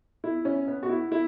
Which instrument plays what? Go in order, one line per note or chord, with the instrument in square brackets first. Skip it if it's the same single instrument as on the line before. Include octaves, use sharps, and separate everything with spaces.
[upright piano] E4
C#4
B3
F#4
E4
E4